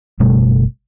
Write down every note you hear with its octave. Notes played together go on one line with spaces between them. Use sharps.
F#1 B2 G3 A3